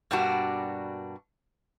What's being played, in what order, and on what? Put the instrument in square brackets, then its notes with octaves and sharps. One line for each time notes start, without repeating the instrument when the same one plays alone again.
[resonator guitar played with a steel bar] G2 B2 G3 A#3 D4 F#4